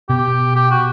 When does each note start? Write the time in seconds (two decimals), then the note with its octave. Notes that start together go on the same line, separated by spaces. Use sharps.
0.09 B2 G4
0.56 G4
0.71 F#4